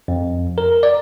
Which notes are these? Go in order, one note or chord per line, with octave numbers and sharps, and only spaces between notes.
F2
A#4
D5